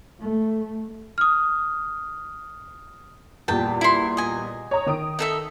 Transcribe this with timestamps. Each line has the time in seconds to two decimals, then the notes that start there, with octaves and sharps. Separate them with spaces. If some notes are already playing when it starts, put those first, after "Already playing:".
0.20 A3
1.18 D#6 F6
3.48 E2 A#2 G3 G5 A5
3.81 E4 C6
4.17 D#5 G#5
4.71 C#5 A#5 D#6
4.86 D#3 D#6 D7
5.19 D#4 A4 E5